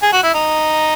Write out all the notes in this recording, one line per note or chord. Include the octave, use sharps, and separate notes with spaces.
G#4
F#4
E4
D#4